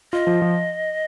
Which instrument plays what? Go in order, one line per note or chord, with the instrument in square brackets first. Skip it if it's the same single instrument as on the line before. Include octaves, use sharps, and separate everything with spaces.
[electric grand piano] F4 [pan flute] D#5
[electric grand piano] F3
F3